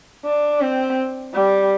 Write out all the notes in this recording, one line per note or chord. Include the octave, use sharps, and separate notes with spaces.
D4
C4
G3